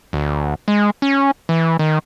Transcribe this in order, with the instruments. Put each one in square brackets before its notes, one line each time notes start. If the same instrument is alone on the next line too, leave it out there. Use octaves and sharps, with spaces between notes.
[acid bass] D2
G#3
C#4
E3
D#3